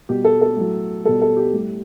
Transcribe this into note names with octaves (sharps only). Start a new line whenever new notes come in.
B2 G3 G4
A4
A4
A2 F#3
B2 G3 A4
A4
G4
A2 G3